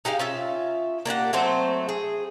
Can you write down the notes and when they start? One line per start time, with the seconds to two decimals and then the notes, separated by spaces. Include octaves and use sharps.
0.05 D#4 G4 G#4 F5
0.19 C#4 F4 E5
1.05 A#3 D4 G4 F#5
1.33 F#3 A3 C4 C5
1.89 G#4